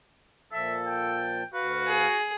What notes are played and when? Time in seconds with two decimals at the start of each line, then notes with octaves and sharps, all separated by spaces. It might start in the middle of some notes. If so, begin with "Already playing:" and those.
0.52 A#2 F3 A4 E5 A5
0.86 G5
1.54 D2 F#4 B4 F5
1.87 G#4